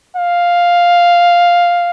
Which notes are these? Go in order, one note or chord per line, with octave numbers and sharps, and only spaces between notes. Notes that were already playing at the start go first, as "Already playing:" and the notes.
F5